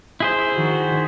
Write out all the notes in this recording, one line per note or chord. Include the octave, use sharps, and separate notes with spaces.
E4 G#4 C5
D#3 F#4